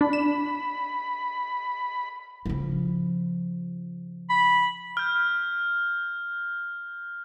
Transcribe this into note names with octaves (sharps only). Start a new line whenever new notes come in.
D4 B5
E7
C#3 F3
B5
F6 G6